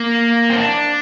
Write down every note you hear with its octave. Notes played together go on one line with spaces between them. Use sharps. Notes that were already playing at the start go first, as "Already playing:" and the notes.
Already playing: A#3
C4
D4